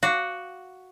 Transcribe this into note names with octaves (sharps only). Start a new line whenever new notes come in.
F#4 F5 D6